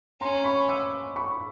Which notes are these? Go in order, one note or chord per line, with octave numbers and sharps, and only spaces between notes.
C#4 A#5 C6
B5 C#6
D6 E6
B5 C#6